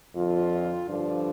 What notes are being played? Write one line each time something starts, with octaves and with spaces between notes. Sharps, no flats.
F2 D3 F3 F4
G2 D3 F3 D4